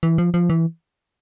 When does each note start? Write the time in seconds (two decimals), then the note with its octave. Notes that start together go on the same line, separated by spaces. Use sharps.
0.03 E3
0.18 F3
0.34 F3
0.50 E3